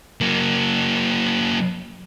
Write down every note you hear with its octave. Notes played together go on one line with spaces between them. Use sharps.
F#3 A#3